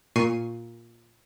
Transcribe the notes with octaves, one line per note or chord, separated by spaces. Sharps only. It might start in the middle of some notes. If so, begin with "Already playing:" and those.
A#2 C#6 C7 D#7